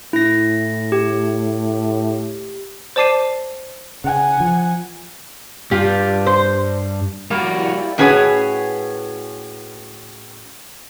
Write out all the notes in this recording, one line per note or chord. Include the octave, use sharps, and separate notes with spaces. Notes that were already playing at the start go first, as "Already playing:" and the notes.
A2 E4 A#6
G4
C5 D5 A5 D6 C7 D#7
C#3 F#5 G#5
F3
G2 F4 G4
C5
G3 A#3 E4 F#4 G4 D5 B5 C#6
A2 C#4 F#4 G#4 B4 C#5